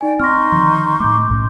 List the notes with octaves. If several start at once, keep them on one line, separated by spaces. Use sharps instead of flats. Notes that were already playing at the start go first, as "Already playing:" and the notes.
D#4 D5 G5 G#5
C4 D#4 C6 C#6 F6 A#6
D3 D#3 F3
A2 A3 D6 G6
B1 A2 C#4